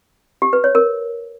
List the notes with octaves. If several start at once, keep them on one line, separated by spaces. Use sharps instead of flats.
G4
B4
C#5
A#4